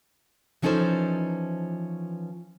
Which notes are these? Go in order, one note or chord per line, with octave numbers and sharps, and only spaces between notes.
E3 F3 C#4 D#4 A4 C5